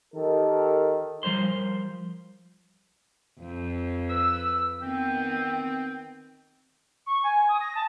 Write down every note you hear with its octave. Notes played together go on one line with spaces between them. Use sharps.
D#3 G4 A4 A#4
F3 G3 A#4 C5 C6
F2
B4 E6
D#3 B3 C4 G5
C#6
G#5
D#6
A#6
A5